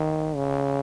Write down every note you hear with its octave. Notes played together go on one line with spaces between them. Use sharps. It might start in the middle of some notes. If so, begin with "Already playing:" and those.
Already playing: D#3
C#3